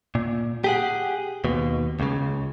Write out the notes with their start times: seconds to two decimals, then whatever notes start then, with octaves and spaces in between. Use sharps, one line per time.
0.15 A#2
0.64 G4 G#4 F#5
1.45 D#2 B2
2.00 C#2 C#3